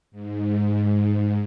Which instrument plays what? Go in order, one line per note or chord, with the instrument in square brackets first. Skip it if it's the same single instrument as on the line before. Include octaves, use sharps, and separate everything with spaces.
[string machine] G#2